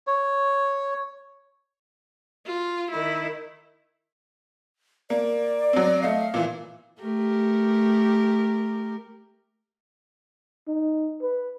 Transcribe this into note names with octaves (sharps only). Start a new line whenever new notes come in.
C#5
F4
D#3 E4
A#3 D5
F#3 C4
A3 D#5 F5 C7
A#2 E3
A3 G4 A#4
D#4
B4